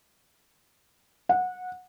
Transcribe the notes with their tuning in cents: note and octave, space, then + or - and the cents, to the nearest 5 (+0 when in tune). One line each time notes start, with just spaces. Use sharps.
F#5 -20